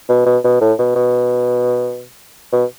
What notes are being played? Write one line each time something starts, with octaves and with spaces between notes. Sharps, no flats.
B2
B2
B2
A2
B2
B2
B2